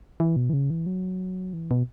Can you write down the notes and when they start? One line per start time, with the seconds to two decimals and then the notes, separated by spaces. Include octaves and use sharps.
0.20 E3
0.36 B2
0.49 E3
0.53 C#3
0.70 E3
0.86 F#3
1.53 E3
1.71 B2